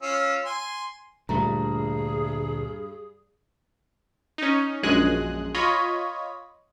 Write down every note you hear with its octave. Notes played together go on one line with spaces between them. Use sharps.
C#4 F4 E6
G#5 C6
D2 G2 A#2 A3 G#4 A#5
C#4 D#4
A#1 F#2 G#3 G#4 F#6
F4 C#5 D#5 B5